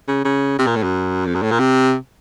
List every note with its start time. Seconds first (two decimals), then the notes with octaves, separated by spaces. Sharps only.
0.08 C#3
0.25 C#3
0.59 C3
0.67 A#2
0.76 A2
0.84 F#2
1.26 F2
1.35 F#2
1.43 A2
1.51 A#2
1.59 C3